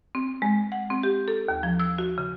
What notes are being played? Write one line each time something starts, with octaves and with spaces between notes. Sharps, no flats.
C4
G#3
F#5
C4
G4
A4
D#2
F3
E6
F#4
C#3